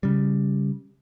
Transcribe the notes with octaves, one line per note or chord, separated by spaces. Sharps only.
C#3 G3